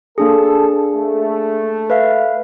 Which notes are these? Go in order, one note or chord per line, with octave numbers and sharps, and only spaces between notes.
A#3 D4 G#4 A4
A3
B4 E5 F5